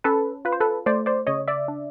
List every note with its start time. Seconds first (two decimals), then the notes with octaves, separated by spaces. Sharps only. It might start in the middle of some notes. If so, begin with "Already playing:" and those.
0.04 C#4 A4 B4
0.45 F4 B4
0.52 C5
0.60 A4 B4
0.86 A3 C5 D5
1.06 C5 D5
1.27 C#3 C#5 D#5
1.48 D5 E5
1.68 D4